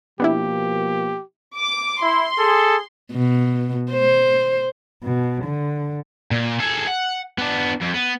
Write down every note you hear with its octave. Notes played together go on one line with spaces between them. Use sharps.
B2 F3 A#3 B3 D4 E4 G4
D6
E4 C6
G#4 A4
B2
C5
B2
D3
A#2
G#4 A4
F#5
B3 D4
F2
B3